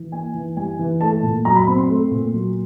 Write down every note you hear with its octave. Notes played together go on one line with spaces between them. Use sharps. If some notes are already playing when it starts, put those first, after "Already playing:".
Already playing: E3
A#3 G#5
E3
G3 G#5
E3
A3 A5
A#2
F#3 A#5
B5
C4 B5
C6
A3
A#2
F#3